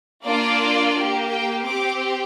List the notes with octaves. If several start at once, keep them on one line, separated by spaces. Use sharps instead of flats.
A#3 D4 F4 D5
A#3 G4
G5
C4 G4 D6